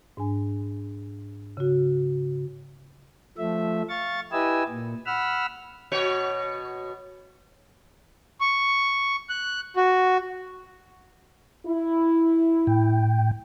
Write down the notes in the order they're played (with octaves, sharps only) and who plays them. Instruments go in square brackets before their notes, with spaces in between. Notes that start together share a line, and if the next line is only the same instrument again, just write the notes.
[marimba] G#2 D4 G#5
C#3 F#4
[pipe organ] F3 A3 E5
F5 C#6 A6
E4 G4 B4 D#5 G#5 E6
A#2
F#5 B5 E6 F6
[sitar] B2 F#4 C#5
[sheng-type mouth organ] C#6
F#6
F#4
[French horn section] E4
[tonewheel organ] A2 G5